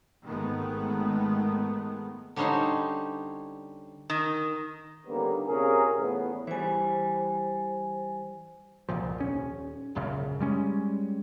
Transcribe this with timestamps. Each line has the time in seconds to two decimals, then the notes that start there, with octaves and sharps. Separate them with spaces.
0.24 G#1 D#3 G#3 A3 B3
2.36 D3 G3 C#4 D#4 C5
4.10 D#3
5.06 D3 D#3 G3 A#3 B3 C#4
5.46 C3 C#4 F4 G#4 A#4
5.97 E2 A2 B3
6.47 E3 G3 C5 G#5
8.89 F#1 C2 A#2 F3
9.18 D#1 C#4
9.95 E1 A#1 F#2 C#3
10.40 G3 G#3 C#4